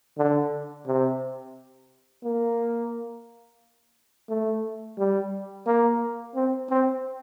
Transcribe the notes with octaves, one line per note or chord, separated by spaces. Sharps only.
D3
C3
A#3
A3
G3
A#3
C4
C4